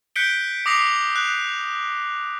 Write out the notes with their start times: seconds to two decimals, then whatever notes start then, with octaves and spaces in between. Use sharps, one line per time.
0.16 F#6 G6 B6 C#7 D7 G7
0.66 D6 D#6 A#6 C7 F7
1.16 F#6